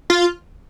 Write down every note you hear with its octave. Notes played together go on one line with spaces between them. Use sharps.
F4